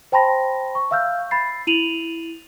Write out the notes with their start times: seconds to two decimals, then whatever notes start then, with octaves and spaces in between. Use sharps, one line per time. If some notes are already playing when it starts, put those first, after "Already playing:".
0.12 C5 G5 A5 B5 C6 A#6
0.75 C#6
0.91 E5 F5 E6 F6 G6
1.31 B5 A6 C7
1.67 E4 D#7 F7 F#7